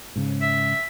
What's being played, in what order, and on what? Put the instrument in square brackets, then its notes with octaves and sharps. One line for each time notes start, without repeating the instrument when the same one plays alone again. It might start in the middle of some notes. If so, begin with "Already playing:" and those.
[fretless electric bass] G#2 C#3
[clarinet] E5